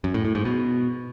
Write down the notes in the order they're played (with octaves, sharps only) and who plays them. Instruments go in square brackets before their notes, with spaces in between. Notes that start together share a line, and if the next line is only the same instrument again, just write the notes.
[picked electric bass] F#2
A2
A2
G#2
B2